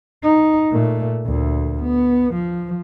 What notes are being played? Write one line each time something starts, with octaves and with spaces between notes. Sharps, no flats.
D#4
A#2 A3
D2 A#2
B3
F3